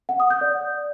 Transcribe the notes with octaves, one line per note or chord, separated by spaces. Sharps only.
F#5
D#6
G6
D5